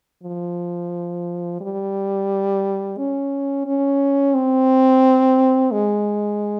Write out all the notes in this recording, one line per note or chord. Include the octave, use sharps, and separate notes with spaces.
F3
G3
C#4
C#4
C4
G#3